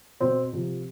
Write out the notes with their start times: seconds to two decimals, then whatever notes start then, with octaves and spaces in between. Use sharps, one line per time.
0.20 B2 C4
0.53 C3 F3